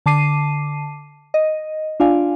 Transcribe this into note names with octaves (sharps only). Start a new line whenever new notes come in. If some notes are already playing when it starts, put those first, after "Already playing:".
D3 A5 D6 C7 D#7
D#5
D4 F4 D5 F5 G#5